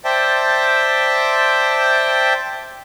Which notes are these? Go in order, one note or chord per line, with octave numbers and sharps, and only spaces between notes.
C5 D5 E5 G5 A5